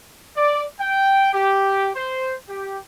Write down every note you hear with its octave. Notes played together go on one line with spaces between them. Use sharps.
D5
G5
G4
C5
G4